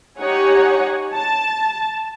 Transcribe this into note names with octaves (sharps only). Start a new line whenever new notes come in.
D#4 G4 C#5 F#5 G#5
A5